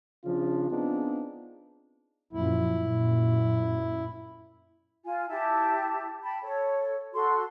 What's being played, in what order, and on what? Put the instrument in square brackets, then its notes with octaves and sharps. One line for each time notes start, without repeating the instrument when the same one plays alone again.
[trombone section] C#3 F3 D4 F4
B3 C4 D4 D#4 F4 G#4
[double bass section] F#2 A#2 F3 [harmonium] E4
[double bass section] F#2 A#2
[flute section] F4 G#5
E4 G4 A5
G5 A5 B5
A4 C#5
F#4 A4 C6